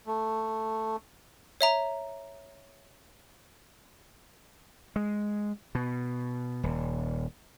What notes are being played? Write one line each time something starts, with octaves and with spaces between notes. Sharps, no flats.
A3
C#5 E5 A#5
G#3
B2
D#1